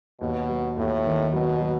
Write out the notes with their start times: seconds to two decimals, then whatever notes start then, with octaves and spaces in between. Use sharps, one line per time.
0.21 D#2 B2
0.49 F#3
0.77 D#2 A2
1.06 D#3
1.33 B2 F#3
1.61 F#3